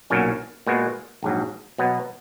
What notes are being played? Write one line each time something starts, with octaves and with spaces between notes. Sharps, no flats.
B1 A#2 F#3 C#4
A#2 G#3 B3 F#4
A#1 G#2 F#3
B2 F#3 B3